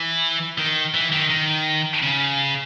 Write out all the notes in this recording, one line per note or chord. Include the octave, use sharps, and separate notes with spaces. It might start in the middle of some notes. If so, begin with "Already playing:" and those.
Already playing: E3
D#3
E3
D#3
D#3
C#3